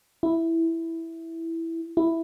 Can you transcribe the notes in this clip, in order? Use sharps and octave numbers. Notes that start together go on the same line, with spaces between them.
E4
E4